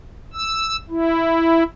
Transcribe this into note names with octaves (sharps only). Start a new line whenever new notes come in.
E6
E4